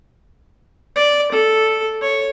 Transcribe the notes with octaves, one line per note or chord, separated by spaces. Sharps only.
D5
A4
C#5